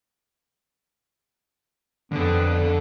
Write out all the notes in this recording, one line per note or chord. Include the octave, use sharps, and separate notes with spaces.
F2 D3 B3 A4